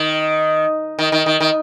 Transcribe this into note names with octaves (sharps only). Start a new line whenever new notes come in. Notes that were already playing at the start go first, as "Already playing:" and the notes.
Already playing: D#3
D#3
D#3
D#3
D#3